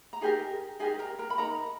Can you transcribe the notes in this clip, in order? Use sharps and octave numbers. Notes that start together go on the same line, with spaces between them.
A#5
D#4 G4 G#4 A#4 G#5
D#4 G4 G#4 A#4 G#5
A#4 A#5
A#4 A#5
B5
D#4 A#4 A#5